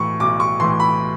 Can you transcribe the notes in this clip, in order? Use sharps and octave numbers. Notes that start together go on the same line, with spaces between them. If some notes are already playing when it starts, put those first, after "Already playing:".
Already playing: B1 A2 E3 C#6
B1 D6
C#6
A2 E3 C6
B5